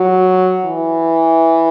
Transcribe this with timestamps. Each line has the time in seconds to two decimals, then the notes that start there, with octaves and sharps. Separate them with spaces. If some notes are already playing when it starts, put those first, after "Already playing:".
Already playing: F#3
0.66 E3